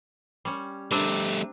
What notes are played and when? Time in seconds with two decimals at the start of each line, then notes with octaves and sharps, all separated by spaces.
0.45 G3 C#4
0.91 G3 A3 C4 D4 A#5